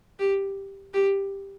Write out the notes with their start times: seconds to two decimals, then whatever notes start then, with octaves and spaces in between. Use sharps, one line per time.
0.19 G4
0.94 G4